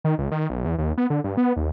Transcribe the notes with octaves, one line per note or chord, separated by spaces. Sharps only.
D#3
C#2
D#3
B1
E2
D#2
B3
D3
G2
B3
D#2